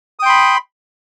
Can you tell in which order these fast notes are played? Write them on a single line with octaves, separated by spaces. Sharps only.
D#6 G5 C6 B5